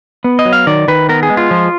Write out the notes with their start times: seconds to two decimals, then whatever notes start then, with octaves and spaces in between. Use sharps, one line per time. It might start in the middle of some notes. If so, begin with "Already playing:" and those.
0.24 B3
0.39 D#5
0.45 F#3
0.53 F5
0.67 D#3 D5
0.88 D#3 B4
1.09 B3 A#4
1.23 G#4
1.30 G#3
1.37 F4
1.51 F3